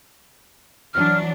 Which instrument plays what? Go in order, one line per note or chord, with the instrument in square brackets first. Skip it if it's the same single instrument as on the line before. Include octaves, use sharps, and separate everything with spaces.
[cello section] E3 F#3 D4 [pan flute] F6